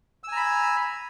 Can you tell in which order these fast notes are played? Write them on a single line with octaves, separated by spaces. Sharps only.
E6 G#5 A#5 B5